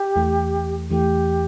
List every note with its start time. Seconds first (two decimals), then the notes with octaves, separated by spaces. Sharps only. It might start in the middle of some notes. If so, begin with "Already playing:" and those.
Already playing: G4
0.16 E2 E3 A3
0.90 E2 E3 A3 G4